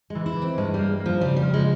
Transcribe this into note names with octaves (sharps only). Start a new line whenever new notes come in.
E3 G#3
E4
E3
C4
G2 G#3
G3 A#3
A#3
F3
C#3 G3
G3
F3
G#3